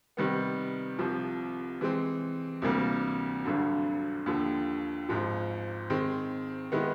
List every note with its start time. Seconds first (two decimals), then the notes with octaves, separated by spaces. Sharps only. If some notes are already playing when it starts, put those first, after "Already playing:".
0.17 C3 D#3 G3 B3
0.99 C2 C3 F3
1.81 E3 G#3 C4
2.62 D2 C3 E3 G3 A#3
3.45 G#1 G2 D3 F#3
4.26 D#2 D3 F3
5.09 G#1 G#2 F3
5.90 D#3 G#3 C4
6.72 D#3 G#3 B3 E4